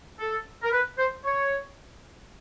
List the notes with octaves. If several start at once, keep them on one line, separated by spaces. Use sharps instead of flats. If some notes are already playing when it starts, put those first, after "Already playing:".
A4
A#4
B4
C5
C#5